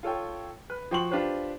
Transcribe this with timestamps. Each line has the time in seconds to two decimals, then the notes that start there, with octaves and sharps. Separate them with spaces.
0.03 F4 A4 C#5 G5
0.70 B4
0.91 F3 F#4 G5 C6 C#6 F#7
1.11 D4 F4 G4 B4 C5